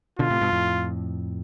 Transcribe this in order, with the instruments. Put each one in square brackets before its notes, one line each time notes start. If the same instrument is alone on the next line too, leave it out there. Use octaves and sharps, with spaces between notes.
[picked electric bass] B2 D3 [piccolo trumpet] F4
[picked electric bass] A2 C3
G2 B2
F2 A2